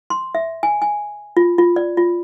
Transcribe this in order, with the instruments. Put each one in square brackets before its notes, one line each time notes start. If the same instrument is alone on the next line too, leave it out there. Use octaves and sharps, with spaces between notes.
[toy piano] C6
E5
G#5
G#5
F4
F4
D5
F4